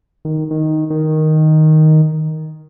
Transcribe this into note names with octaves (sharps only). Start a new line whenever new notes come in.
D#3
D#3
D#3